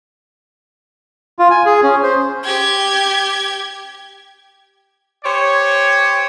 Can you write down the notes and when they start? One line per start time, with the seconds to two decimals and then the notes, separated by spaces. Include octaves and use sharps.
1.39 F4
1.51 G#5
1.66 G#4
1.83 C#4
2.03 C5
2.45 G4 G#6
5.24 G4 C5 C#5